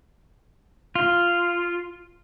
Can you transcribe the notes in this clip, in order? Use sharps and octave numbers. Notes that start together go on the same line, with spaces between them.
F4